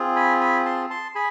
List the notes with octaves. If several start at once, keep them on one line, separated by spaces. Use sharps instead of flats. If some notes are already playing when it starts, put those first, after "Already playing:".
Already playing: C4 F4 G#4
G#5 B5
G#5 B5
A5 C6
A5 C6
G#4 G#5 B5